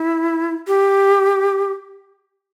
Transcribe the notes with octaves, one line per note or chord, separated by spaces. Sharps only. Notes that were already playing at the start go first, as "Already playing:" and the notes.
Already playing: E4
G4